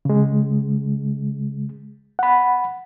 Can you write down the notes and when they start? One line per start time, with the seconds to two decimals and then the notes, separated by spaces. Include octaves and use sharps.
0.05 C#3 G#3
2.19 F#5 B5